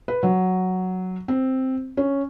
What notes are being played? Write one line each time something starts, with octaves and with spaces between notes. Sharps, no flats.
B4
F#3
C4
C#4